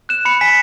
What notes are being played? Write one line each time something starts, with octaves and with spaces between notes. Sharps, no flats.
F#6 E7
B5 C#7
G#5 B6